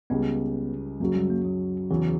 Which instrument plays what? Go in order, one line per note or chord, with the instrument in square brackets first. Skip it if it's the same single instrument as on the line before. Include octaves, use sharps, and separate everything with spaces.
[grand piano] C#2 C#3 G3 [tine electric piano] B3
[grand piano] F#2 C#3 F#3 [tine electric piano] A#3
[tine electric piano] G3
A#3
F#3
[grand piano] E2 C#3 F#3 [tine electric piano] E3